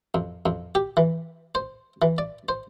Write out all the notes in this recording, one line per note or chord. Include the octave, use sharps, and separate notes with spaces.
F2
F2
G4
E3
C5
E3
D5
C5